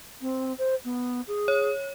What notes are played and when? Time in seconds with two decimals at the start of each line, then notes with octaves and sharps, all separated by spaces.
0.21 C4
0.58 C5
0.84 B3
1.27 G#4
1.48 C#5